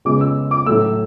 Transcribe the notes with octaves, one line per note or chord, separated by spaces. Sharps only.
C#3 G#3 B3 D6
E6
D6
A2 F#3 A3 E6